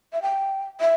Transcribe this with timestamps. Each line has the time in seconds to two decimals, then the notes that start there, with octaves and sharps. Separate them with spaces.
0.13 E5
0.22 G5
0.81 E5